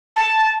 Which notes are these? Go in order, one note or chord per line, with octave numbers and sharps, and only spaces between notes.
A5